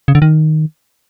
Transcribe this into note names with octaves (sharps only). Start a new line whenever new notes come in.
C#3
D3
D#3